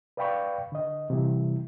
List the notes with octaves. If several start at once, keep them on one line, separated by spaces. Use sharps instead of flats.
B4 D5 F5 G5 B5 C#6
D3 D#5
C3 E3 G3 E4